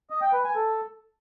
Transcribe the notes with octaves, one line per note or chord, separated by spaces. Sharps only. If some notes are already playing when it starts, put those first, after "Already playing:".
D#5
G5
B4
G#5
A4